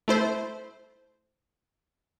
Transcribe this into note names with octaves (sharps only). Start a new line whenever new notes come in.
A3 E4 C5